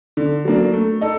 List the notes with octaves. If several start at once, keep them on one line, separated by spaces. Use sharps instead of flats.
D3
F#3 A#3 D4
A3
D#4 A4